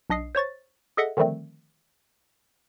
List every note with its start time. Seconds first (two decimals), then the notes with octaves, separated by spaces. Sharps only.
0.10 B1 D4 D#5 D#6 C7
0.35 C5 C#5 C#6 A6
0.97 G#4 A4 D#5 E5 F#5
1.17 D3 D#3 F3 G3 A3 C4